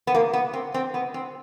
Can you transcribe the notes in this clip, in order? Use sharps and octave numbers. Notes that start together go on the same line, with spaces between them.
B3
A#3
B3
C4
C4
B3
C4